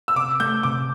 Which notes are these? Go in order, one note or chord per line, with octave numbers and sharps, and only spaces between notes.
E6
C3 D6
A3 G6
C3 D6